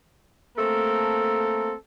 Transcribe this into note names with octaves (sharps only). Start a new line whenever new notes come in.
A3 A#3 C4 A4 A#4